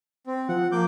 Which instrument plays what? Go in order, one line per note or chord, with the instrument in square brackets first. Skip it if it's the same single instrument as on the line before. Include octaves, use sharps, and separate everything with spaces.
[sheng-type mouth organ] C4
[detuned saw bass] F3 [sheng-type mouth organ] F#5
[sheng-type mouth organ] A#3 D6 G6